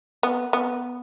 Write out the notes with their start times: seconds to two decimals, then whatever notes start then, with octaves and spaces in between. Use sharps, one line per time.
0.23 B3
0.53 B3